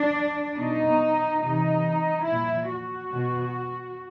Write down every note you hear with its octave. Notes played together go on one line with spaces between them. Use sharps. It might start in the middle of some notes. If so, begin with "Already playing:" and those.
Already playing: D4
B2 D#4
C3 E3 D#4
A#2 F3 E4
F#4
B2